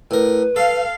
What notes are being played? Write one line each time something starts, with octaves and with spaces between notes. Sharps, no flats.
A2 A#4 B4
A4 F5